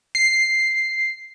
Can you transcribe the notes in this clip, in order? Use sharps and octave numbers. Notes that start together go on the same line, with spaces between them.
C7